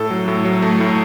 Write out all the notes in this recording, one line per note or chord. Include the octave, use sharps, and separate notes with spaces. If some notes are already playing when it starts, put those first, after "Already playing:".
Already playing: A2 A4
F#3
A2
F#3
A3
A2